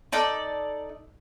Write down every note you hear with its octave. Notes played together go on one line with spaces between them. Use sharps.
D#4 A4 D5